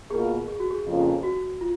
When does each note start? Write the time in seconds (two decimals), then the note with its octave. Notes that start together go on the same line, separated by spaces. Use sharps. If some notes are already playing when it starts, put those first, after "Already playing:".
0.10 B2 A#3 F4 G#4 A#4
0.48 G#4
0.60 F#4
0.71 G#4
0.85 F2 C#3 F3 A#3
1.23 F#4
1.61 F4